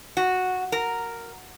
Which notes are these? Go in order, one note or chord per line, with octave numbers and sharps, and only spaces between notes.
F#4
A#4